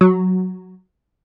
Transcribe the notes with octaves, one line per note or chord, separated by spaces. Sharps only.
F#3